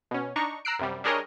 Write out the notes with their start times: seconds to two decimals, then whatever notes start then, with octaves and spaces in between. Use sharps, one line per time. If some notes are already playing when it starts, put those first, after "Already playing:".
0.11 B2 C#4
0.36 D4 D#4 A#5 C#6
0.65 A#5 E6 F#6 C7 D7
0.79 F#2 C3 G3
1.04 G3 D4 G#4 A#4 C#5 D#5